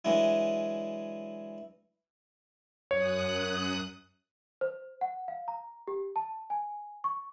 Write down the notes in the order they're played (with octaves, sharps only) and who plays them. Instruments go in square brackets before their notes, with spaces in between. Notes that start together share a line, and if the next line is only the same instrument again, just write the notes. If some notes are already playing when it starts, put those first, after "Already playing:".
[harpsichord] E3 F#3 G#3 D4 E4
[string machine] F#2 D#6 F#6 [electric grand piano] C#5
[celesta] C5
F#5
F5
A#5
G4
A5
G#5
C#6